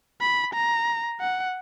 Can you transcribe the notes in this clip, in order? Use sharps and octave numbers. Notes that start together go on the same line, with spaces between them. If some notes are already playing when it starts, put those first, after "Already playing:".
B5
A#5
F#5